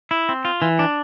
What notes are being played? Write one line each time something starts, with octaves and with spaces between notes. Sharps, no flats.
E4
C4
F4
E3
D4